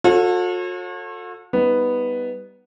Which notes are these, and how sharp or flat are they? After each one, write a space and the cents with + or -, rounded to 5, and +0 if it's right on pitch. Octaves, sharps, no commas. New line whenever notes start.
F#4 -45 A4 +15 C#5 -35
G3 +0 B3 +0 D#4 +25